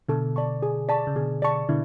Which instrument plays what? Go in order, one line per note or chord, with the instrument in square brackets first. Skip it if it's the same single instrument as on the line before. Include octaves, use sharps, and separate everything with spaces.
[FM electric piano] B2 D3 [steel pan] A4
[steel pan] D5 A5 C#6
G#4
D5 A5 C#6
[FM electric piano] C#3
[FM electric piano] B2 D3 [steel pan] G#4
[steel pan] D5 A5 C#6
[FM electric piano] B2 D3 [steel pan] E4